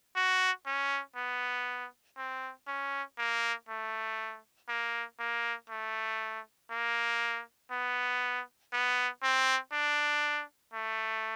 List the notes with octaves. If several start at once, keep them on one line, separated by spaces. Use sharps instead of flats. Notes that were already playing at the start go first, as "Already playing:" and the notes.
F#4
C#4
B3
C4
C#4
A#3
A3
A#3
A#3
A3
A#3
B3
B3
C4
D4
A3